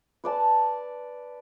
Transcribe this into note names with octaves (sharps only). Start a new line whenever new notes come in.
B4 D5 A5